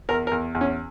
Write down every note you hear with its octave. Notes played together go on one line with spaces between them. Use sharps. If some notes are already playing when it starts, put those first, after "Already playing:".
E2 A#4
A#4
E2
E2
C#4